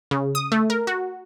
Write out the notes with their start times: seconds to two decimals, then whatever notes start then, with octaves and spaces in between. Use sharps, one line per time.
0.11 C#3
0.35 D#6
0.52 A3
0.70 A#4
0.87 F#4